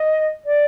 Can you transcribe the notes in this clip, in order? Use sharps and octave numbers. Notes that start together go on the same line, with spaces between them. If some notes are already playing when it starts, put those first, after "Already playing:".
Already playing: D#5
D5